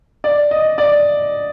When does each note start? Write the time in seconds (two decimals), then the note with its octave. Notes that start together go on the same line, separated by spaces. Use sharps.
0.24 D5
0.51 D#5
0.78 D5